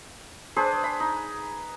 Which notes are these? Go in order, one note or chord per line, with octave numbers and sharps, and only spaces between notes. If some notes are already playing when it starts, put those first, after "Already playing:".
D4 G#4 B4 C5
B5
D#4